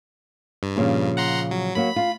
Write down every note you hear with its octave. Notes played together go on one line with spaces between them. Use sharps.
G2
A#2 C#3 F3
F#5 A#5 C6
F#3
F#3 A#3 F#4 B5
F4